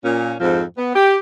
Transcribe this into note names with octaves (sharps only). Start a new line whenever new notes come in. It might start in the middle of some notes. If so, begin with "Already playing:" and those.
A#2 C#4
F2 G#2 F3 C4
B3
G4